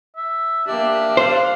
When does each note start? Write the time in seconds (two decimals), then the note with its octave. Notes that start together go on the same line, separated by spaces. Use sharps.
0.16 E5
0.67 A#3 D4 G4 E5
1.17 C5 F5